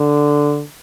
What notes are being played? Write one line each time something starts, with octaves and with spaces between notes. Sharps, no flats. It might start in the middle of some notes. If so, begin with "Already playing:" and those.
Already playing: D3